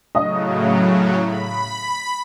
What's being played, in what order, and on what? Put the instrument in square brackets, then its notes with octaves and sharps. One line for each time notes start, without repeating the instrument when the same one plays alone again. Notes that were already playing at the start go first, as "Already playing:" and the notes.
[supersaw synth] A2 C#3 F#3 [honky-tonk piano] D#5
[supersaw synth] B5